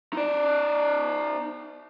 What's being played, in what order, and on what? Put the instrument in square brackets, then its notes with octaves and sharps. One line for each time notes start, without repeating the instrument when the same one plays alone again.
[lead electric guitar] D#4 D5